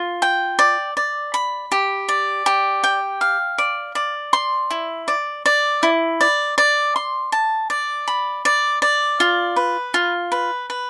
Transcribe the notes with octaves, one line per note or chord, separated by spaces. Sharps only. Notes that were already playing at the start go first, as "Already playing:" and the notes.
Already playing: F4
G5
D5
D5
B5
G4
D5
G4
G5
F5
D5
D5
C6
E4
D5
D5
E4
D5
D5
C6
A5
D5
B5
D5
D5
F4
B4
F4
B4
B4